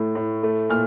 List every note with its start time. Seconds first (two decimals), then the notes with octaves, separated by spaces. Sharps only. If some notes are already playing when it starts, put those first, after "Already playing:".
Already playing: A2 A3
0.15 A2
0.43 A3
0.70 A#2 F6